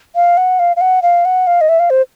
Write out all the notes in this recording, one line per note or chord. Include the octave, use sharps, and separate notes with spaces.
F5
F#5
F5
F5
F#5
F5
F#5
F5
D#5
E5
F5
C5